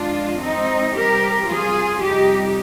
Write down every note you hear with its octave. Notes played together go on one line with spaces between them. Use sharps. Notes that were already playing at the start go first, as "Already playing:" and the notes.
Already playing: F2 D#3 G#3 D4 F4
C4 D#4
C3 G3 G4 A#4
F4 G#4
F2 C3 G3 D#4 G4